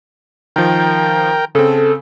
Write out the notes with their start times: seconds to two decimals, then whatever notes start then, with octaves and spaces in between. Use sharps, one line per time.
0.56 D#3 F3 A#4 G5
1.55 C#3 C4 A4